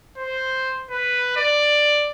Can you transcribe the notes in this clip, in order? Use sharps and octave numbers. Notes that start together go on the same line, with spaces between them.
C5
B4
D5